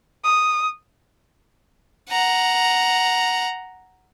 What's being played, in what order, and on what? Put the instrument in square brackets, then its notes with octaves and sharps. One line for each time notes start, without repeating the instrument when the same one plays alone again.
[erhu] D#6
[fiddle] F#5 A#5